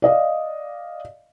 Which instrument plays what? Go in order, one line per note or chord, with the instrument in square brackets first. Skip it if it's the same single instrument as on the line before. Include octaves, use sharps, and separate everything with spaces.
[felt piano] D5 D#5 F5